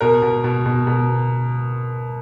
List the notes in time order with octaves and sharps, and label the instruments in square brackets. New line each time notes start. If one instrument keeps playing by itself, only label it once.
[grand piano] B2 A#4
B2
B2
B2
B2